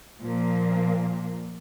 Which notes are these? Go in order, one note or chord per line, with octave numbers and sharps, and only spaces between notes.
A#2 F3 A#3